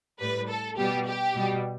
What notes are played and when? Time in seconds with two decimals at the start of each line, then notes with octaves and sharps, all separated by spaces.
0.19 A2 G3 B4
0.48 A4
0.77 B2 G3 G4
1.06 G4
1.35 B2 G3